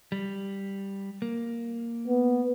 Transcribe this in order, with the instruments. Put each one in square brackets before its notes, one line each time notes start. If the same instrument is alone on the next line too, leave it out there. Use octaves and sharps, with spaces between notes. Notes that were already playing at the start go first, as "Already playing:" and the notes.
[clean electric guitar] G3
A#3
[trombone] B3